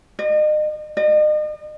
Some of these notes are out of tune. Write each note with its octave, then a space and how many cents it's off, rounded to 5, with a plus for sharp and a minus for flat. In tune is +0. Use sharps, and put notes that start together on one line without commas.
D#5 -40
D#5 -40